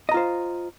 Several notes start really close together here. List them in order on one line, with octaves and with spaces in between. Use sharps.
D#5 A#5 F4 C5